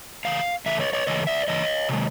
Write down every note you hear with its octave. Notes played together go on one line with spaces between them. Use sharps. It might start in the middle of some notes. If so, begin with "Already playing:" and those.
C#3 E3 A3 F5
C#3 E3 A3 E5
C#5 D#5
C#5 D#5
C#3 E3 A3 C#5 D#5
D5 E5
C#3 E3 C#5 D#5
C3 D#3 G#3